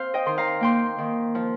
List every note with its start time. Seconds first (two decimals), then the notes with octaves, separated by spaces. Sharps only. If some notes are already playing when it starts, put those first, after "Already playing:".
Already playing: C4 C5 F5
0.14 D#5 G5
0.26 D#3 C6
0.38 F5 A#5
0.61 A#3 G5 C6
0.98 D#3
1.35 F3